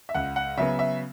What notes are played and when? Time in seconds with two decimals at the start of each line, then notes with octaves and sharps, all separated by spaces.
0.09 E5
0.15 C#2 F#5
0.36 F#5
0.57 C#3 F#3 B3 E5
0.79 E5